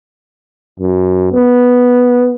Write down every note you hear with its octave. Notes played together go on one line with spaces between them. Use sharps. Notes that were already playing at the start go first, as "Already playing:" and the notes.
F#2
B3